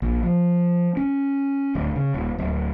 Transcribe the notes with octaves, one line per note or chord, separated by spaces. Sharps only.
A#1
F3
C#4
D1
C#3
D#1
D1